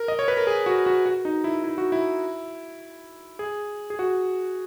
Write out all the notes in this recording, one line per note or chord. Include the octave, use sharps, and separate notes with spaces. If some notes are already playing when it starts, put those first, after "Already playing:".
Already playing: A#4
D#5
C#5
B4
A#4
G#4
F#4
F#4
F#4
D#4
E4
E4
F#4
E4
G#4
G#4
F#4